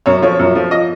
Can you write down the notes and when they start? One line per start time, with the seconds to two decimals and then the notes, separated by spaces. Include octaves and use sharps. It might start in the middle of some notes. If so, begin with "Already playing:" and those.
0.06 F#2 C#5
0.22 F3 C#5
0.39 F#2
0.55 F3
0.71 D#5